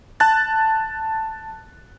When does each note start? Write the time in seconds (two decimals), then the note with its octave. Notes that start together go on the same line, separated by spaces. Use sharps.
0.20 A5 F#6 A6